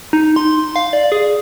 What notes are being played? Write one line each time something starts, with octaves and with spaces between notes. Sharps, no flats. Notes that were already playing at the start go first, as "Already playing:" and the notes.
D#4
C6
F5
D5
G#4